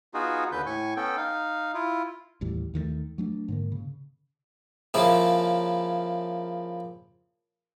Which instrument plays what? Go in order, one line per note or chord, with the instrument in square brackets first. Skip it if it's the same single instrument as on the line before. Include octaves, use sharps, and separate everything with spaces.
[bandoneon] B3 D#4 F4 F#4 G#4
D#2 D3 B4 G6
A2 G#5 C#6
B3 C#4 A4 G5
D#4 F5
E4 F4
[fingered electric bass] A1 D#2 A2 G3
D#2 D#3 F3 A3
F#3 A3 D4
G#2 D3 A#3
C#3
[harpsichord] C#3 F3 A#3 E4